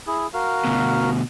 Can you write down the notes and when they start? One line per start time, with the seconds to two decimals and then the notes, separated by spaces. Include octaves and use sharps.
0.07 E4 G#4
0.34 F#4 A#4 F5
0.65 D2 B2